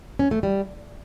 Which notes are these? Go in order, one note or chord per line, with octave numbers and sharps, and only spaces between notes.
C#4
A3
G3